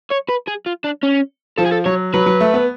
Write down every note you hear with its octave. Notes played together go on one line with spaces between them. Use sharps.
C#5
B4
G#4
F4
D4
C#4
F3 A4
G#4
A4
F#3 C#5
F#3 B4
F#3
A3
B3